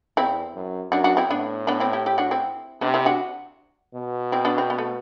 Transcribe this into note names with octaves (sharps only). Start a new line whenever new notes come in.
E2 C4 E4
F#2
F#2 D4 F#4
D4 F#4
C4 E4
A2 B3 D4
B3 D4
C4 E4
E4 G4
E4 G4
D4 F#4
C4 E4
C3 B3 D4
C4 E4
D4 F#4
B2
C4 E4
B3 D4
C4
B3
A3